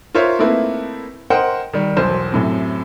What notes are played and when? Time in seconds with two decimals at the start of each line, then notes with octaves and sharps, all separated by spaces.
0.15 F4 A#4 C5 C#5 E5
0.39 A3 A#3 C4 D#4 E4 B4
1.30 A#4 C5 D#5 F#5 G5
1.73 D#3 G3
1.97 E1 B1 C5
2.32 F#2 A2 C3